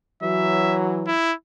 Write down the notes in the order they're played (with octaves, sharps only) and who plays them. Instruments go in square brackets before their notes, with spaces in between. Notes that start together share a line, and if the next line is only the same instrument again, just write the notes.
[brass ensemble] E3 F#3 [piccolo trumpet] E5
[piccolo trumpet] E4